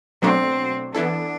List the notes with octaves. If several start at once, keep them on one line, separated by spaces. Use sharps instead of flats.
B2 F#3 A3 C4 D4
E3 B3 D4 E4 A4